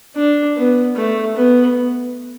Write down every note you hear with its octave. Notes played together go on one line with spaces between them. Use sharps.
D4
B3
A3
B3